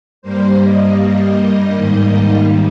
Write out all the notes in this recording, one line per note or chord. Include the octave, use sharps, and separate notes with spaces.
G2 G3 A#3 C5
D#5
D#5
G#2 D#3 G3 A#3